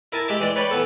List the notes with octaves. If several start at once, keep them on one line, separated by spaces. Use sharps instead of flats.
E4 A#4 G#5 A5
G#3 G4 E5 D6
E3 G#3 D5
B4 C#5 D5 G5 B5
E3 B3 A4